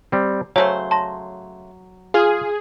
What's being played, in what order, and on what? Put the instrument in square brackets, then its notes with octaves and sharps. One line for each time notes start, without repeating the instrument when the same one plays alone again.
[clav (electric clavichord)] G3 C4
[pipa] C#3 A3 C5 [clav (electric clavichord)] F#3 [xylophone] C#5
[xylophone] A5 C6 A#6
[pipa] F4 [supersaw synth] G#4